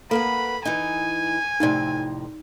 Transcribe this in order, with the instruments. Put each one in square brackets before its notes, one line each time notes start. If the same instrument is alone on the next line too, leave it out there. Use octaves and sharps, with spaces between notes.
[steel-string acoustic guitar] A#3 B4 F#5 [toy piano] A4 [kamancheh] B5
[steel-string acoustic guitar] E3 D#4 [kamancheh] G#5
[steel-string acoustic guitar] F2 A2 C3 [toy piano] D#4 D5